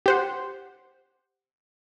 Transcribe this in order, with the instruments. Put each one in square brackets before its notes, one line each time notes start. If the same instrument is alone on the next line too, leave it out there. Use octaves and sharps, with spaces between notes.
[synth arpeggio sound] G4 C5 F#5